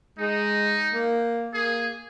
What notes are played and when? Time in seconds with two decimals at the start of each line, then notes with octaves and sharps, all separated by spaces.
0.19 G#3 D#4
0.93 A#3
1.54 A#3 G#4